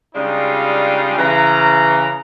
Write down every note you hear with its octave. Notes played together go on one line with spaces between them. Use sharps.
C#3 G3 G#3 D4 D#4 F4
C#3 E3 A#5